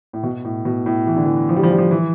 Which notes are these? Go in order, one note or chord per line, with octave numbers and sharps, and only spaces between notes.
A2
B2
A2
B2
A2
E3
D3
E3
F3
G3
F3
G3
F3
E3